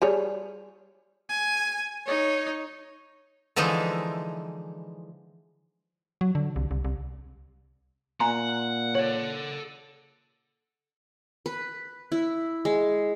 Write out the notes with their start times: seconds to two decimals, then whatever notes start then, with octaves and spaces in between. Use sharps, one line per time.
0.02 G3 G#4 C#5
1.29 G#5
2.06 D#4 C#5
3.56 D3 E3 F3 G#3 D#4 E4
6.21 F#3
6.35 D3
6.56 C2
6.71 C2
6.85 C2
8.20 A#2 F#5 G#5 A#5 C6
8.95 A4 C#5 F#5
11.46 B4
12.12 E4
12.65 G#3